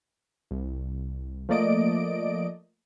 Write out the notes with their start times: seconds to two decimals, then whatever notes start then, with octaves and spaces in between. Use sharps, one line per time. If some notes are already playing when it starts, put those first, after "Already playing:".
0.51 C2
1.49 F3 A3 A#3 D5 D#5 D7